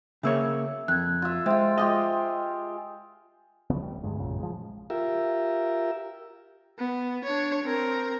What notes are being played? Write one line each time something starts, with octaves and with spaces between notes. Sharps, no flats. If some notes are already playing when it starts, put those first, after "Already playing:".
C#3 A#3 C#5 E5 E6
F2 F#6 G#6
F4 E5
G#3 F4 C5 E5 G5 C6
G#3 F4 G4 D#5
C#2 C#3 F3 B3
D1 G3
D2 G2 G#3
A#1 F#2 A#2 C#3
F3 G#3
F4 G4 A#4 E5
B3
D4 C#5
C4 A#4